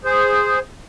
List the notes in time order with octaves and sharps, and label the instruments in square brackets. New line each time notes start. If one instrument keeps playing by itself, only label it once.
[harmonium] G#4 C5